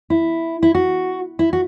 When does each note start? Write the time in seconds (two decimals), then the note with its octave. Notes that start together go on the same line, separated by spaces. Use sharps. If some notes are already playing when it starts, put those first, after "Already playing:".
0.10 E4
0.63 E4
0.75 F#4
1.39 E4
1.53 F#4